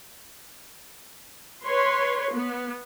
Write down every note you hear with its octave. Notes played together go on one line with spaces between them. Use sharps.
B4 C#5 C6
B3